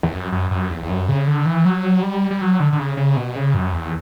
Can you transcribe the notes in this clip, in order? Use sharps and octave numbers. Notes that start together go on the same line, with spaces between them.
E2
F#2
F#2
F#2
E2
E2
F#2
C#3
D3
E3
F#3
G3
G3
F#3
D3
D3
C#3
C#3
B2
C#3
F#2
E2